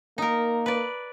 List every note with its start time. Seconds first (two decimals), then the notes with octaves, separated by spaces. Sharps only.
0.18 A#3 D#4 A#4
0.66 B4 D5